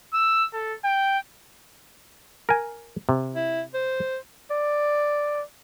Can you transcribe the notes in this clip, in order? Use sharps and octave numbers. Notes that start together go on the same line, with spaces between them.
E6
A4
G5
A#4 G#5
C3
E4
C5
D5